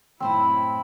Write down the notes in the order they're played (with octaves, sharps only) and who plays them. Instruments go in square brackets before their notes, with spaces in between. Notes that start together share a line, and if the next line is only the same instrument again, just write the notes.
[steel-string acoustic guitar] F#2 A2 C5 [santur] C4 [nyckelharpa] E4 B5